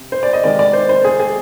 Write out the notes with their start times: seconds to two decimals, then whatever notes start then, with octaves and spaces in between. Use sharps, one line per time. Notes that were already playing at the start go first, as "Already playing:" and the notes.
Already playing: C3
0.12 C5
0.23 D5
0.33 D#5
0.44 C3 D#3 G#3 D5
0.59 D5
0.73 C5
0.89 C5
1.05 G#4
1.20 G#4